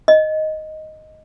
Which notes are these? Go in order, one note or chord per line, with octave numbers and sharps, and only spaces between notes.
D#5